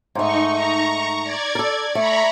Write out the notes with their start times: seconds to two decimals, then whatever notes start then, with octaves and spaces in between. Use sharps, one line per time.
0.15 G#2 A3 D#4 C#6
0.52 A#5 C#6
1.24 D5 G#6
1.55 A4 A#4
1.95 A3 A#5 B5 C#6